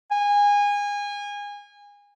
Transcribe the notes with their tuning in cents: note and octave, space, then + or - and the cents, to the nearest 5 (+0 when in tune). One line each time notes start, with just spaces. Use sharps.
G#5 -25